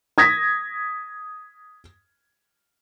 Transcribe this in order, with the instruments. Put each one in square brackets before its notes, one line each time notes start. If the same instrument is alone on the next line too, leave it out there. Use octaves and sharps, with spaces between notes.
[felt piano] D#6 G#6 A#6 B6